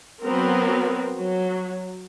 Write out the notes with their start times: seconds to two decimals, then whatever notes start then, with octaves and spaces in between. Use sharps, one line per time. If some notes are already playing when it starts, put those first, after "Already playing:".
0.22 F#3 B3 C4 A#4
1.17 F#3